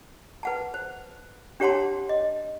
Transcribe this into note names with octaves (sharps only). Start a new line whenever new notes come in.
B4 F#5 A5
C5
D4 G4 C#5 F#5 A5 C6
D#5